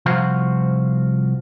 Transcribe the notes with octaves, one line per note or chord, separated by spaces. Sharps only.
C2 F3 F4 F#4 C5 F5